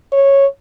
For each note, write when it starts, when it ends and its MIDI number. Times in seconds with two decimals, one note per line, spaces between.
0.12 0.46 73